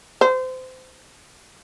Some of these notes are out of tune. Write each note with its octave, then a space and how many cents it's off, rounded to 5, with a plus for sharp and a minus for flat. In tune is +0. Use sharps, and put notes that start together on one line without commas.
C5 -25